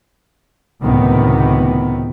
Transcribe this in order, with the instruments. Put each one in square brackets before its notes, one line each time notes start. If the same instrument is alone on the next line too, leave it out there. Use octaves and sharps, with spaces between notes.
[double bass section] C#2 A2 C3 D#3 B3